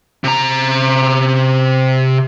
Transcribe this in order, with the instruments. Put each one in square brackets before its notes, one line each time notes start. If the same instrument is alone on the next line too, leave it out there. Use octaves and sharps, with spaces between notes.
[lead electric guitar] C3 A#5